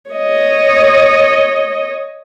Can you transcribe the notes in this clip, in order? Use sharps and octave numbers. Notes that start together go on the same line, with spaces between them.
C#5 D#5